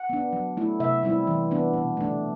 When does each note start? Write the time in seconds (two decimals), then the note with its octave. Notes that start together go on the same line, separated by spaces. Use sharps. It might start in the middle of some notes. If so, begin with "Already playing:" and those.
Already playing: F#5
0.10 B3 D4
0.33 F#3
0.57 A3 E4
0.80 C3 E5
1.03 G3 C4 E4
1.27 E3
1.51 B3 D4
1.74 B2
1.97 A3 D4